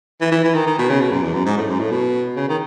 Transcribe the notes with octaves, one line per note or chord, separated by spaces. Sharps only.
E3
E3
E3
D#3
D#3
B2
C#3
B2
F#2
E2
F#2
G#2
A2
F#2
A2
B2
C#3
D#3